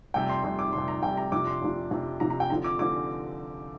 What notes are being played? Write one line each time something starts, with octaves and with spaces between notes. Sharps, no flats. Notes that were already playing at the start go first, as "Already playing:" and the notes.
F2 C3 G3 G5
C6
F2 C3 G3 C6
D6
F2 C3 G3 C6
A#5
F2 C3 G3 G5
A#5
F2 C3 F3 D4 D6
C6
F2 C3 F3 D4
F2 C3 F3 D4
F2 C3 F3 D4 A#5
A#5
G5
D3 F3 C4 A#5
D6
D3 F3 C4 D6